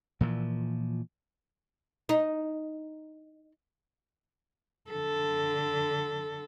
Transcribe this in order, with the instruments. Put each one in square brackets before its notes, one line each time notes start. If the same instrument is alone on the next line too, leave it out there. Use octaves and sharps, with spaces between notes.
[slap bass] A#2 E3 F3
[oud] D#4
[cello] D3 A4